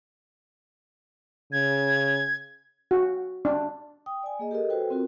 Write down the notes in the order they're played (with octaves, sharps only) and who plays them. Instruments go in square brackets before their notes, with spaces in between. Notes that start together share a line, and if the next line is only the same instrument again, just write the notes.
[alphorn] C#3 [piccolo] G#6
[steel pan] F#4
D4
[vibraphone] G5 D#6
D5 G#5
A#3 G#4 D#5
G4 A4 A#4 D#5
F#4 A4 B4 C5 G5
C4 F4 F#4 A#4